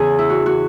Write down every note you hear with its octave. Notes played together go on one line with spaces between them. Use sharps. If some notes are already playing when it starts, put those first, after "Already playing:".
Already playing: E2 C#3 E3 B3 G#4
E4
F#4
F#4